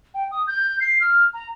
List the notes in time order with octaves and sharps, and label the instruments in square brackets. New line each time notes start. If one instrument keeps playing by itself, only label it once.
[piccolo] G5
D#6
G6
C7
F6
A#5